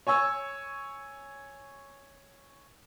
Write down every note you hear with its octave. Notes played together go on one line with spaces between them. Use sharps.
C#5 G#5 C#6 E6